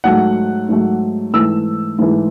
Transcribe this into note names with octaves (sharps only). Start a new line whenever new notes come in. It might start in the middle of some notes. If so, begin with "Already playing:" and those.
G#2 F#3 A3 F#5
G#2 F#3 A3
G#2 E3 A3 E6
G#2 E3 A3